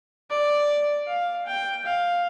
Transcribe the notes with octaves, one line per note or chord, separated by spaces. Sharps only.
D5
F5
G5
F5